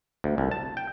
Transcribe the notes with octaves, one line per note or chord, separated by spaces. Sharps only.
D2
C2
A5
G5